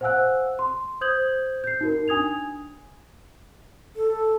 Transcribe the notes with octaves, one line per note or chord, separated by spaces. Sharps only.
C5 F5 F#5 G#5 E6 F#6
C6
C5 D#6 G6 G#6 F#7
G6 C7
D#4 F#4 A#4
D4 G#5 D#6 G#6 F7
A4